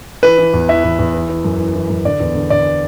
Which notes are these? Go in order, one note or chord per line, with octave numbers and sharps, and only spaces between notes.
E3 B4
E3
E2
E3 E5
E2
E2
E3
E3
F#2
E3
E3
F#2
D3 D5
E2
D3
D3 D5